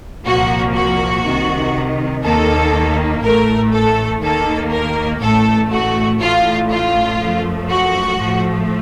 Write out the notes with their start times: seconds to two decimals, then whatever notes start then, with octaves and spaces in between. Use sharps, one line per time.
0.25 C2 A#2 F3 A#3 F#4
0.75 F#4
1.24 C2 C3 D#3
2.23 D#2 D#3 A#3 A4
3.22 A1 A2 A3 A#4
3.73 A4
4.21 D#2 D#3 A#3 A4
4.71 A#4
5.21 A1 A2 A3 A4
5.70 F#4
6.20 A1 A2 A3 F4
6.70 F4
7.19 F#2 F3 A3
7.69 F#4
8.19 A2 F3 A3